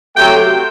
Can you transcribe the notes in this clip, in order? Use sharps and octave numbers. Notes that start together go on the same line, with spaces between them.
C3 F#3 A3 G5